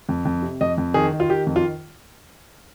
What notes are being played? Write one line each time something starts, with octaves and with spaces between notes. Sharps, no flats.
F2
F2
C3
F2 D#5
F2
D#3 G#4
D#3
F4
D#3 G4
F2
F4